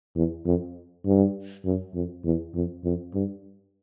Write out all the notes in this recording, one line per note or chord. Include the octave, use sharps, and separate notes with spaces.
E2
F2
G2
F#2
F2
E2
F2
F2
G2